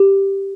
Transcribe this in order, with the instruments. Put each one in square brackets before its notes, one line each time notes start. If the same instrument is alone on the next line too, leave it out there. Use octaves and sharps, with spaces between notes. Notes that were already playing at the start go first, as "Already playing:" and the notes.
Already playing: [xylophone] G4